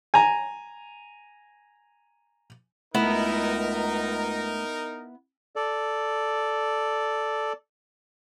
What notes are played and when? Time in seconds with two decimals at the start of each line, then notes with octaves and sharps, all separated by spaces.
0.14 G#5 A#5
2.95 C#2 A3 B3 D#4 E4 A#4
5.56 A4 D5